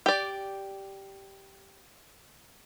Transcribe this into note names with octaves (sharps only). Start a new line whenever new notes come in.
G4 D5